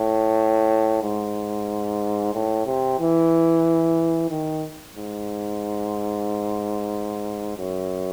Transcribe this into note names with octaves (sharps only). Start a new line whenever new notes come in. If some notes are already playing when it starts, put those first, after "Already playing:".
Already playing: A2
G#2
A2
C3
E3
D#3
G#2
F#2